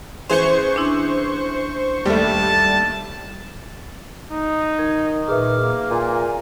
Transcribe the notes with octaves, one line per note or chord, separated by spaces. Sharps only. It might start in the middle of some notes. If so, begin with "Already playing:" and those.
E3 C#4 G#4 C5 C#6 F7
D4 E4
D#2 G3 A3 A5
D#4
D#3 G#6
A#2 G#4 B4 E5 D6 F6
A#3
A#2 G#5